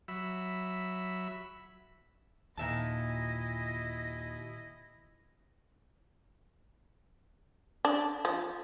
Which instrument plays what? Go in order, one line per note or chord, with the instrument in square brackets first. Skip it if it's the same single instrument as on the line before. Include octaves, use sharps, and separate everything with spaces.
[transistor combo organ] F#3 E5 B5
[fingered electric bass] D#2 D#3 [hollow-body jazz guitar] A#2 E5 A5 [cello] E4 D#5
[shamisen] D4
F3